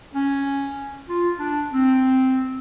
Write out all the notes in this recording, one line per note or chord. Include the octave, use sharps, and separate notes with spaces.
C#4
F4
D4
C4